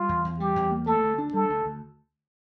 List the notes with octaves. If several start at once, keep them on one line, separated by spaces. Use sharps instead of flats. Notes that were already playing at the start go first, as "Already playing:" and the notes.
Already playing: G3 F4
E2
E2
G3 G4
E2
A#3
A3 A4
D2
D4
G3 A4
D2
D2